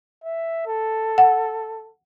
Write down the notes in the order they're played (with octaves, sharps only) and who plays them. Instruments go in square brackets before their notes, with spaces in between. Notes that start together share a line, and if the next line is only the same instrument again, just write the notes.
[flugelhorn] E5
A4
[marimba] F#5